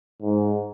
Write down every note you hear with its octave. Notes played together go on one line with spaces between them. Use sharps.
G#2